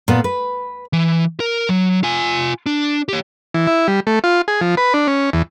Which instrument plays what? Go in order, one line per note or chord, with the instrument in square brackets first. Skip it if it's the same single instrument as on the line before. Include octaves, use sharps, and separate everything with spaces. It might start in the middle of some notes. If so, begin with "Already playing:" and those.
[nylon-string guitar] A#2 B3
B4
[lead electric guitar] E3
A#4
F#3
F4 G#5
D4
G4 C#5
[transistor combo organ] E3
E4
G3
A3
F4
G#4
F3
B4
D4
C#4
E2